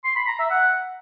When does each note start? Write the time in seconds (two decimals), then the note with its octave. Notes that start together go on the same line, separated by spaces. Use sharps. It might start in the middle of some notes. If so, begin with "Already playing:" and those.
0.04 C6
0.16 B5
0.27 A#5
0.39 E5
0.51 F#5